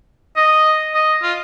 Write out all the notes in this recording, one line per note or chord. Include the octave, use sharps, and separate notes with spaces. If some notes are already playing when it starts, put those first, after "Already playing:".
D#5
D#5
F4